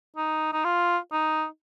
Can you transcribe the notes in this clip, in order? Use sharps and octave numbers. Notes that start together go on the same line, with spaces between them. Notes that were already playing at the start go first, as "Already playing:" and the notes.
D#4
D#4
F4
D#4